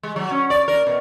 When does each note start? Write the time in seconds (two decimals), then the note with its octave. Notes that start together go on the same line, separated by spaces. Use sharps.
0.03 G#3
0.16 F#3
0.31 C#4
0.50 D5
0.68 A#4
0.87 B2